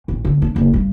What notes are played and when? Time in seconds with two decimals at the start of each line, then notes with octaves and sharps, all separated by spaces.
0.08 A1
0.25 D3
0.42 D4
0.56 F#1
0.74 G2